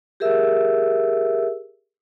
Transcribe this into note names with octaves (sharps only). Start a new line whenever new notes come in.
G4 G#4 A#4 E5 E6